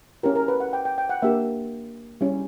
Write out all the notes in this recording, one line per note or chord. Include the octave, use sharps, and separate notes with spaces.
C#4 E4 G4 A#4
A#4
B4
F#5
G5
G5
G5
F#5
A#3 D4 G4 E5
G3 C#4 E4